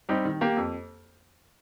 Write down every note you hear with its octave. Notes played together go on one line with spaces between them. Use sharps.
G3 C4 D#4 G4
D#3
A#3 G4
F2